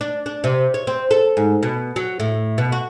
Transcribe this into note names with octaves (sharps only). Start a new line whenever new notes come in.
D4
D4
C3
C#5
C4
A4
G#2
B2
F#3
A2
B2
F#4